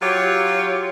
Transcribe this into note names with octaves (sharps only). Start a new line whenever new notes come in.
F#3 F4 G4 C#5